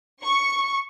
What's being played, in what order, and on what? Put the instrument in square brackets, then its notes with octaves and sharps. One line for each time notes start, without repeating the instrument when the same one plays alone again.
[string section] C#6